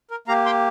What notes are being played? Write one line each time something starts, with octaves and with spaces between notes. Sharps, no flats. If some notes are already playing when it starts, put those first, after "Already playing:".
A#4
A#3 G4 F5 A#5
G5 C6